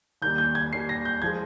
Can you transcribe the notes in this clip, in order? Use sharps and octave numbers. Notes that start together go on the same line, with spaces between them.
D#2 D#3 G3 G6
G6
G#6
D#2 D#3 G3 C7
A#6
G6
F3 G#3 G#6